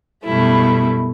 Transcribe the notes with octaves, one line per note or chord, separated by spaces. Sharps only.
F#2 B2 G3 A3 E4